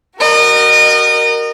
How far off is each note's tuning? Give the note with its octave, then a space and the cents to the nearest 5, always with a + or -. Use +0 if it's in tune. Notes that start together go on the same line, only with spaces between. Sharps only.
F#4 +25 A#4 +0 D#5 -30